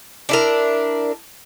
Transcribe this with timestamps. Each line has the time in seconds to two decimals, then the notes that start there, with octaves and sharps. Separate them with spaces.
0.29 D4 E4 A#4